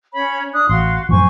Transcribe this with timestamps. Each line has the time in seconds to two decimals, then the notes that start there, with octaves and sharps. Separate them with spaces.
0.13 C#4 C#5 B5
0.53 D4 D#6 F#6
0.69 A1 F#4 F5 C6
1.09 F#2 A2 F3 C5 G#5 C#6